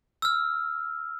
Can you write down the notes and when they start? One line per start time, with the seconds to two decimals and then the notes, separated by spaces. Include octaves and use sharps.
0.22 E6 F6